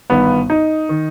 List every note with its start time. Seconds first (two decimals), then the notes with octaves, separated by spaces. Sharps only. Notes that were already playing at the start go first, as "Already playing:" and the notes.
0.10 G1 G2 D#3 B3
0.50 D#4
0.89 D#3